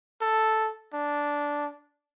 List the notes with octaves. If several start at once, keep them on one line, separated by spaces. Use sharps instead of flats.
A4
D4